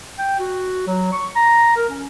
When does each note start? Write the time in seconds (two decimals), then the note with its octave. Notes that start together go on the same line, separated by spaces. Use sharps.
0.18 G5
0.39 F#4
0.87 F#3
1.12 C#6
1.36 A#5
1.76 A#4
1.90 C#4